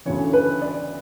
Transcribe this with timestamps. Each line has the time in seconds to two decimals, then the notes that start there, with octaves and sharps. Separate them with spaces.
0.05 D2 C#3 E3 C#5
0.33 B4
0.61 D5